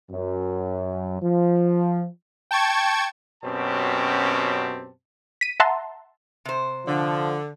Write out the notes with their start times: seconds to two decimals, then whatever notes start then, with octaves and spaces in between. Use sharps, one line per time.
0.10 F#2
1.22 F3
2.51 G5 A5 C#6 G#6
3.43 F#2 B2 C4 C#4 G4 A5
5.41 B6 D#7
5.60 E5 F#5 A5 A#5 C6
6.45 C3 C5
6.87 D3 F3